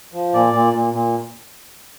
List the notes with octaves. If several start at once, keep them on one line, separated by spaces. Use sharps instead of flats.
F3
A#2 D5
A#2
A#2
A#2